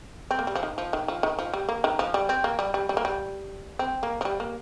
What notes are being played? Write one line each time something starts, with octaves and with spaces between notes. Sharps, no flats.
C4
A#3
G3
F3
D#3
F3
D#3
F3
D#3
F3
G3
A#3
D#3
F3
G3
C4
A#3
G3
G3
G3
A#3
G3
C4
A#3
F3
G3
A#3